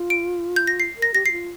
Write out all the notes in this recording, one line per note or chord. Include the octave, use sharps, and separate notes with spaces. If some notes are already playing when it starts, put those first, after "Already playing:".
Already playing: F4
D7
G6
A#6
C7
A#4
A#6
G4 A#6
G4 C7
F4